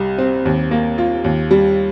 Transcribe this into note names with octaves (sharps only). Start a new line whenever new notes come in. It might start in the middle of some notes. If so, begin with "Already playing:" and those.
Already playing: C2 G3
C4
D#2
A#3
F4
D#2
G3